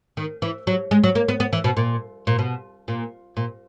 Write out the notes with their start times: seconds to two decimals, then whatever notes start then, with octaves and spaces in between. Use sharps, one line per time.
0.17 D#3
0.42 E3
0.67 F#3
0.91 G#3
1.04 F#3
1.15 A#3
1.28 B3
1.40 B3
1.53 E3
1.64 B2
1.77 A#2
2.27 A#2
2.39 B2
2.88 A#2
3.37 A#2